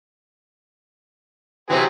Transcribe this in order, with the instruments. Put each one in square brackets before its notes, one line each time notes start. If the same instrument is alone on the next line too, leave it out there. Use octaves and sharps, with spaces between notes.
[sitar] C3 E3 [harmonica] F#3 C4 G#4